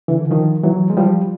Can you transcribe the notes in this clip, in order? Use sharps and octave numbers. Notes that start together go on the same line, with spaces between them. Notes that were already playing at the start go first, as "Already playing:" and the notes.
D3 E3
D#3 F3
E3 F#3
G#3
F3 G3